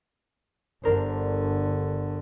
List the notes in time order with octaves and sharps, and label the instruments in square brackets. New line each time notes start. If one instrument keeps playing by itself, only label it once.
[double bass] G1 D3 [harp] D4 A#4 C5